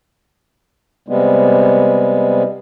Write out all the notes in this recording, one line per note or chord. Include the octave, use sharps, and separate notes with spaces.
C3 G3 G#3 B3